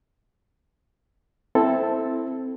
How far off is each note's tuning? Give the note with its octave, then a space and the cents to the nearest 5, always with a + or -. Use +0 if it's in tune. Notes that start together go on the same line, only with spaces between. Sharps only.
C4 +0 E4 +0 A4 +0